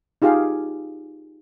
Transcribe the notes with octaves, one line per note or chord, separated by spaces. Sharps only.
D#4 F4 G4 G#4 F5